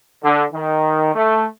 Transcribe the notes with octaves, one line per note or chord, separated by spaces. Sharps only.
D3
D#3
A3